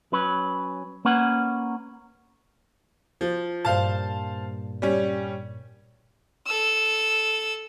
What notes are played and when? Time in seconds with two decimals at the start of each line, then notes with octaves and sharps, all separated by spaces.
0.12 F#3 C#4 B4
1.05 A#3 C#4 B4 F#5
3.21 F3
3.65 G2 A#2 C5 F5 A5
4.82 G3 C#4
6.46 A4 E6